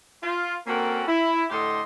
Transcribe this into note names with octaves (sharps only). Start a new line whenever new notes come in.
F4
A#3 C4 C#4 F#4 A4 A#4
E4
A2 D3 G4 A4 D#5 C6